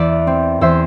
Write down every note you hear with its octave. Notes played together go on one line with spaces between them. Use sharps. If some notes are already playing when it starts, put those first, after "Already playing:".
Already playing: E2 B4 D5 E5
C4
E2 C5 E5